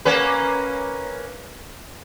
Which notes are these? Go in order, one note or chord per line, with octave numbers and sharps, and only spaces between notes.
A#3 C#4 B4